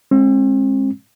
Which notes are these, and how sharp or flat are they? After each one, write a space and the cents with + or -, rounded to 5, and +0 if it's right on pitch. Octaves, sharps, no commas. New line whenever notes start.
G#3 +0 C4 +40